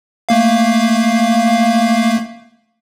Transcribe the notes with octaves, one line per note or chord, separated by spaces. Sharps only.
A3 A#3 F5